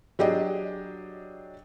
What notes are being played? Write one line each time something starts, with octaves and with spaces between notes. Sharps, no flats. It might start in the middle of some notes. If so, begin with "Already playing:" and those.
F#3 D4 G4 G#4 D#5